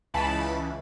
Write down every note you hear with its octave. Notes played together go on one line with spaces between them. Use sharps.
C#2 C#3 E3 A5 B5